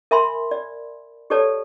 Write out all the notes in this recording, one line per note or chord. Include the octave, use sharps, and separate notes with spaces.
A#4 E5 G#5 B5 C6
D5
G4 A4 B4 C#5 D5 A5